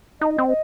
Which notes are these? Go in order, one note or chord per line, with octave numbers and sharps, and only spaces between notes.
D#4 D#5
C4
D#5